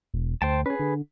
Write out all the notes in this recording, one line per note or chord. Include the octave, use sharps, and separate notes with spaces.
E1
D2 C5 G5 A5
C#4 G#4 B4
D3